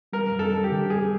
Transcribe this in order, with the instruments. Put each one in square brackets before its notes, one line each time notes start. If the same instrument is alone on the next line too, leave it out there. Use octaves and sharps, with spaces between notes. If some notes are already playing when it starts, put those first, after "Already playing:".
[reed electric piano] G3 [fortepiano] A#4
[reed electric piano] F#2
[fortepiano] A4
[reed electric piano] F#2
[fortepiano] G4
[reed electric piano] D3
[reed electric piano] G3 [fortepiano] G#4